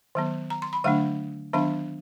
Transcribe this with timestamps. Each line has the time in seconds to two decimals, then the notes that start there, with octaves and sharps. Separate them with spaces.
0.15 D#3 F#3 B3
0.50 A#5
0.62 C6
0.73 B5
0.84 D3 F#3 A3 D4 F5
1.53 D#3 F#3 B3 D4 F5